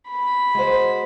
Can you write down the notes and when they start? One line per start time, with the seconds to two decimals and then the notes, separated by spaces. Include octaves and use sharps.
0.10 B5
0.55 G#3 F#4 C5